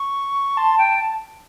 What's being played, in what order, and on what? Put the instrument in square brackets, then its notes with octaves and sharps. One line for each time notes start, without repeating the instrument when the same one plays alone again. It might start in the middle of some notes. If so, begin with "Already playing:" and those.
Already playing: [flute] C#6
[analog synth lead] A5 [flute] C6
[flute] G5